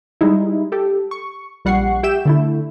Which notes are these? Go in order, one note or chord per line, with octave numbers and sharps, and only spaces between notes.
G3 G#3 D#4 E4
G4 A4
C#6
A#1 G3 F#5 C#6 C7
G4 E5 G5 G6 E7
D3 A3 E4